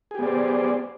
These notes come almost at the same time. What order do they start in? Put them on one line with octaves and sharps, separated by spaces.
G#4 G4 B3 D5 C5